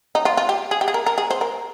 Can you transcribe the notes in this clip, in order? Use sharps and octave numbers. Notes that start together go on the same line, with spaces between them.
D#4
F4
F4
G4
G#4
G4
G#4
A#4
A#4
G#4
C5
A#4